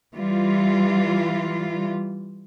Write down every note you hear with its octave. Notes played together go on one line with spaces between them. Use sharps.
E3 G3 F4